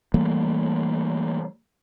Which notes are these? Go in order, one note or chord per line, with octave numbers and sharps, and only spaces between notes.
E3 G3 A3 A#3